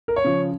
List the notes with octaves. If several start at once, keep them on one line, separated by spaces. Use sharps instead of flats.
A#4
C#5
C#3 F3